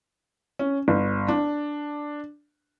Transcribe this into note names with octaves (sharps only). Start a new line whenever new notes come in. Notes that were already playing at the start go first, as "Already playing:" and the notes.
C#4
G1
D4